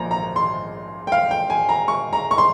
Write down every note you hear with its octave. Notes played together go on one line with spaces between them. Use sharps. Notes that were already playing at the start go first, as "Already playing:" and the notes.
Already playing: A#1 A#2 F3 A#5
A#5
C6
G5
F5
G5
G#5
A#5
C#6
A#5
C#6
C6